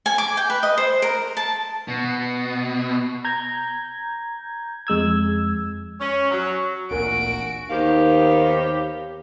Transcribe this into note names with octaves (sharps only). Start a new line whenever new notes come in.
G#5
D6
G5
B4
D#5
C5
A#4
A5
B2
A#5 G6 G#6
F2 G#3 E6 G#6
C#4
F#3
D1 A1 A#2 D4 F#4 A#4 G#5 D7
D#2 D#3 B3 G4 C5 F5